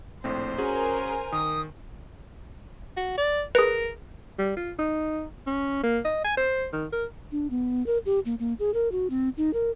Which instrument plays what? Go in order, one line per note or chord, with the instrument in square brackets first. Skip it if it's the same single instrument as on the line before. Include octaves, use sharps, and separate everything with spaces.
[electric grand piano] A#1 A2 C4 [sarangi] C5
[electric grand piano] C#4 F#4 G#4 [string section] A#4 G#5
[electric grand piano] D#3 [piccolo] D#6
[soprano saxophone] F#4
D5
[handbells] G#4 B4 [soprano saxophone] A#4
[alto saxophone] G3
F4
D#4
C#4
A#3
D#5
G#5
C5
D#3
A#4
[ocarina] D4
B3
A#4
G4
A#3
A#3
G#4
A#4
F#4
C4
D#4
A#4